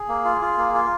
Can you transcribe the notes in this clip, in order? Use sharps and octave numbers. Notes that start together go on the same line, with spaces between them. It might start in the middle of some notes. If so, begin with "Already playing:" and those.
Already playing: G#4
A#3
F4
F4
A#3
F4